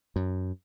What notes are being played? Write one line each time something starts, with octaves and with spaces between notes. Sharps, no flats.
F#2